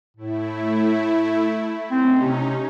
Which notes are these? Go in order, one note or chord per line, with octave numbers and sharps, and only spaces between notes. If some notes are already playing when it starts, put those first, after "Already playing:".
A2 A3 E4
C4 C#4 D#4
C3